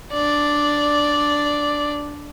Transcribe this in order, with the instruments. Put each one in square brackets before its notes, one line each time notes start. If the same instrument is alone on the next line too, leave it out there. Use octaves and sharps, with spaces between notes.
[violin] D4 D5